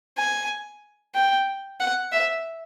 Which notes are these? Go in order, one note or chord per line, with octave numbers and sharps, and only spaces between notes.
G#5
G5
F#5
E5